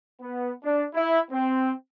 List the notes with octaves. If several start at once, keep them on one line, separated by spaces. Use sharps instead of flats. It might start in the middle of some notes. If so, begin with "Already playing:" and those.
B3
D4
E4
C4